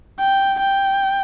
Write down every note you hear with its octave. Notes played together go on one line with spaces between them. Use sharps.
G5
G5